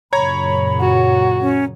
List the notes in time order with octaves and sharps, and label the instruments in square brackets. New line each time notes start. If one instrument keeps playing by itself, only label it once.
[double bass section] F#2 A#2 C#3 [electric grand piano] C#5 A#5 G#6 [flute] B5
[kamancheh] F#4
[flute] C#4